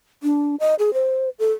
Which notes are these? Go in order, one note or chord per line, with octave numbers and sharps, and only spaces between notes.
D4
D#5
G#4
C5
A4